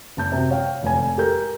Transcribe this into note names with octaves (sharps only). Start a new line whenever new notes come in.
F#1 A5 G6
C3 F#4
C#5 F5 G5
F1 G#5
G4 A4 A#4 G6